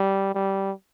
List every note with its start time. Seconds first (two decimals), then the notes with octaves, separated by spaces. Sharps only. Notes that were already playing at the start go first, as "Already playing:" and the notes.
Already playing: G3
0.34 G3